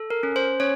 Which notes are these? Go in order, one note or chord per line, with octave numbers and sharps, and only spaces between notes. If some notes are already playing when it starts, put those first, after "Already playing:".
Already playing: A4
A#4
C#4
C5
C#4 C#5